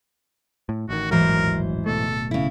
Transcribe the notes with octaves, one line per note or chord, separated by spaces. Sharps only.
A2
A1 D#3 F#4
D#1 A1 G#2 E3 F#3 A#4 C5
D1 B2 A3 A4
C#3 E4